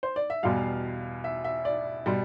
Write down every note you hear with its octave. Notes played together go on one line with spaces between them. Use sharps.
C5
D5
E5
E2 B2 G3 F5
E5
E5
D5
B2 G3